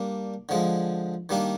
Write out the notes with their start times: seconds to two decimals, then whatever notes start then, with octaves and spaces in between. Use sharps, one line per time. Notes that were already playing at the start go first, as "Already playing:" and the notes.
Already playing: G3 A#3 D4
0.49 D3 F3 G#3
1.29 D#3 G3 A#3 D4